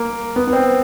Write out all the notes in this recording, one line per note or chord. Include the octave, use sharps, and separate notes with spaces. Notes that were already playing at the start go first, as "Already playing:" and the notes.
Already playing: A#3
B3
B3
C4